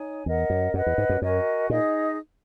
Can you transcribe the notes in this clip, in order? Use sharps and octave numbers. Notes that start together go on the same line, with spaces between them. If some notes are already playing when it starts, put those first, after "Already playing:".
Already playing: D#4 C#5 G#5
E2 A#4 D#5 F#5
F#2
F#2 B4 D#5 F#5
E2
G#2
F#2
F#2 F#4 A#4 D#5 G#5
A#2 D#4 G#4 D#5